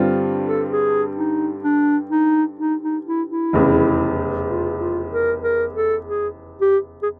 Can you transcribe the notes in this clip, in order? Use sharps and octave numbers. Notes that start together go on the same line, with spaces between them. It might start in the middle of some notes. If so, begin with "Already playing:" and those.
Already playing: G2 D3 G3 C4 F4
A4
G#4
D#4
D4
D#4
D#4
D#4
E4
E4
F1 E2 C#3
F4
F4
A#4
A#4
A4
G#4
G4
G#4